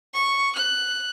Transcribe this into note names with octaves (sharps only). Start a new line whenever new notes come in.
C#6
F#6